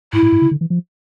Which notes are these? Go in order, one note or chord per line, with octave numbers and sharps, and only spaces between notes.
G#2 E4
A2
G#2
C#3
D3
E3
F3